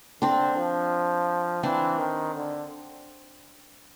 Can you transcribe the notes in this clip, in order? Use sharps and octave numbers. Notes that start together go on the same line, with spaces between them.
D3 C4 D4
F3
E3 C4 D4
D#3
D3